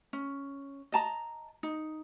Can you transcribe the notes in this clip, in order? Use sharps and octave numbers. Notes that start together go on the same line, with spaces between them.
C#4
D#5 A5 A#5
D#4